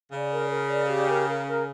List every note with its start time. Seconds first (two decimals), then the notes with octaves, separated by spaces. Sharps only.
0.11 C#3 D5
0.32 A#4
0.51 A#4
0.70 D5
0.89 G4
1.08 A#4
1.28 A#4
1.47 A#4